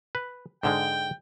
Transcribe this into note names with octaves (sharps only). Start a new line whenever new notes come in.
B4
G#2 D3 G#3 G5